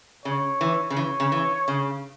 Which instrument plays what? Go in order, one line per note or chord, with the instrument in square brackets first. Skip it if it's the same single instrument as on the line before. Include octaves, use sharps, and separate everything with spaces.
[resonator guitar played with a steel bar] C#3 [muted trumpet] C#5
[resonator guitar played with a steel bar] E3
C#3
[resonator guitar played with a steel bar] E3 [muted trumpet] C#5
[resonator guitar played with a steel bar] C#3
E3
C#3